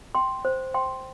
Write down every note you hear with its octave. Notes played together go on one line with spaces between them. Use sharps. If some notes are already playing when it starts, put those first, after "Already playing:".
G5 C6
C5
G5 C6